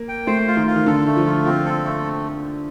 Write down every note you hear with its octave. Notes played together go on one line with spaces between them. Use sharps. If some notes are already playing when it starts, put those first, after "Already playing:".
Already playing: A#3
G5
A3 C5
F4
D#3
F4
D#3
D3 A4
A3
F3
F4
F3 C4
A4
A3